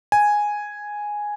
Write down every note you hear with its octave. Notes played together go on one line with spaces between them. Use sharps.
G#5